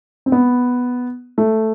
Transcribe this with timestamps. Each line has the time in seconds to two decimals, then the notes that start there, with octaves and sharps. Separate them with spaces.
0.26 C4
0.32 B3
1.38 A3